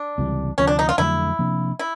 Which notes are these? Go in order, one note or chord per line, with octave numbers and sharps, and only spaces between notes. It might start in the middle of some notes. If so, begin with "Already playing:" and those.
Already playing: D4
C#2 C3 E3 G3
D2 C3 F3 C#4
D4
D#4
F4
F2 D3 F#3 A3 E4
C3 F3 A#3 D4
E4